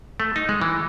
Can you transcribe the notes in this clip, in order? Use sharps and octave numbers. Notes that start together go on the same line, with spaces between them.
A3
D#4
G#3
E3